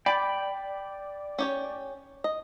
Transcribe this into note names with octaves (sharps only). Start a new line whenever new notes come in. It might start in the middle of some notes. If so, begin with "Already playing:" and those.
D5 G5 B5
C#4 G4 C#5
D#5